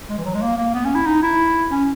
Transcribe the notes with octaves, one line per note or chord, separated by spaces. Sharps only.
G#3
E3
F#3
G#3
A#3
A#3
B3
C#4
E4
D#4
E4
C#4